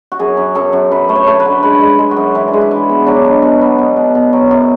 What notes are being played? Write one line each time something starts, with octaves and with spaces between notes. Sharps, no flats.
F#4
F#2 G#4
F#2
F#2 A4
F#2
F#2 B4
A3
C#5
A3
B4
D3
G#3 B4
G#3
G#3
F#4
F#2
E3 E4
D4
G#3
E4
E3
B3
F#3 D4
B2
B2
B3
B2
B2
B2
F#3
F#2